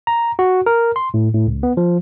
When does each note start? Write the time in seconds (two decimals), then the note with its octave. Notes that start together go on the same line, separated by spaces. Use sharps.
0.07 A#5
0.39 F#4
0.66 A#4
0.96 C6
1.14 A2
1.34 A2
1.47 C#2
1.63 B3
1.77 F3